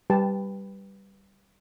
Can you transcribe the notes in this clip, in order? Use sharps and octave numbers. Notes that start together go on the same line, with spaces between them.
G3 G4 B4 A5